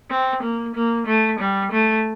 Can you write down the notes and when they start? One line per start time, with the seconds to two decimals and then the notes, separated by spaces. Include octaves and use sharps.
0.11 C4
0.43 A#3
0.75 A#3
1.07 A3
1.40 G3
1.72 A3